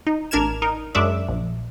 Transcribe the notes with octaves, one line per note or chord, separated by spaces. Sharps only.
D#4
A1 D4 A#4 F6 G#6 E7
D#4 A#4
F#2 G#3 D4 D5 E5
A#1